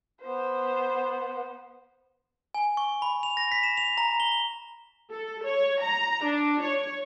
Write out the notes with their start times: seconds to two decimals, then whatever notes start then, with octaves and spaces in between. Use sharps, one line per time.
0.22 B3 C5
2.54 G#5
2.77 C#6
3.02 B5
3.23 F7
3.37 A#6
3.52 B6
3.63 E7
3.77 F7
3.97 A#5
4.20 G7
5.11 A4
5.45 C#5
5.81 A#5
6.23 D4
6.61 C#5